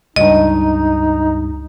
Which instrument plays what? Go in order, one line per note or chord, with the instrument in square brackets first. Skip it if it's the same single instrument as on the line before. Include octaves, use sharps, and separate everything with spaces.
[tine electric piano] C#2 G2 [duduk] D#4 [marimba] D#5